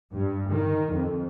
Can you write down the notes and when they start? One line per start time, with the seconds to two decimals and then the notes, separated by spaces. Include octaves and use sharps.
0.13 G2
0.50 D#3
0.93 F2